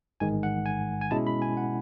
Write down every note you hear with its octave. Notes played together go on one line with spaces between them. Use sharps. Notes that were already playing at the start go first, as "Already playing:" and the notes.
A1 G#2 D#3 G#3 G#5
F#5
G#5
G#5
B2 G#3 C#4 E4 A5
B5
G#5
F#5